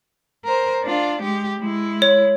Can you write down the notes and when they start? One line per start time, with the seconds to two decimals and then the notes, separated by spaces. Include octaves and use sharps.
0.45 A#4 C5
0.83 D4 F4
1.21 G#3 G4
1.60 G#3 E4
2.02 C#5